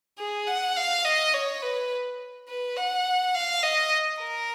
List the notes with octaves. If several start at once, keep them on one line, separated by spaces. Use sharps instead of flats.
G#4
F#5
F5
D#5
C#5
B4
B4
F#5
F5
D#5
A#4